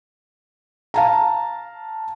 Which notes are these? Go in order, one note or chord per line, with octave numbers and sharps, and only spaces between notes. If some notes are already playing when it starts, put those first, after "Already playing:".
F5 A5 A#5